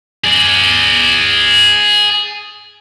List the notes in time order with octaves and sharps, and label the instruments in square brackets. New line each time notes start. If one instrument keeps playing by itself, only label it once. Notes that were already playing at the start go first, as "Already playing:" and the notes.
[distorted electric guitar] G#4 D5